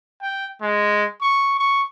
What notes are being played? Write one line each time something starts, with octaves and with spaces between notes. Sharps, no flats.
G5
G#3
C#6
C#6